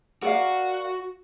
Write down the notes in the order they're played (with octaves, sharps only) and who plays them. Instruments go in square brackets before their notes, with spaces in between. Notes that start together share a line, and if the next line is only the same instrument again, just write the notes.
[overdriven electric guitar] F#4 [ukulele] A#4 D5 F5